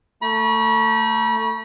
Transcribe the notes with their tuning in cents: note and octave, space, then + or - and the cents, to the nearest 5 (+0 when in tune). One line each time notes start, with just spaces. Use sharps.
A3 +20 B5 -40